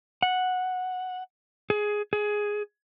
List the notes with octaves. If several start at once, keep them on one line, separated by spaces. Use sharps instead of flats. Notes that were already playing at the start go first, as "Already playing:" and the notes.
F#5
G#4
G#4